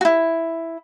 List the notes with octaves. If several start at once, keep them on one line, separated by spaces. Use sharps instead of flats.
E4 F#4